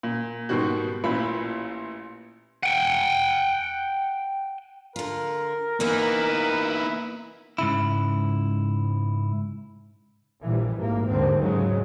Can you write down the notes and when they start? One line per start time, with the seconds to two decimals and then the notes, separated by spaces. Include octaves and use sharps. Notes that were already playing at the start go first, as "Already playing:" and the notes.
0.03 A#2
0.49 G#2 B2 D#3 G3 F#4
1.04 A1 A#2 E4 F4 B5
2.63 F#5 G5
4.96 D3 F4 A#4
5.80 E3 A#3 B3 D#4 E4 B4
7.58 G#2 C#3 E4
10.42 A#1 A#2 E3 G3
10.76 G#1 A2 A#3
11.07 D#2 G#2 D3 G3 C4
11.39 G#2 C#3 F#3 G#3